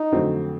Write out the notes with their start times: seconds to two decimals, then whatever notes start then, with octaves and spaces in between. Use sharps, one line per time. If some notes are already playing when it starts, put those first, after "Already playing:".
Already playing: D#4
0.12 F2 D3 F#3 A3 C4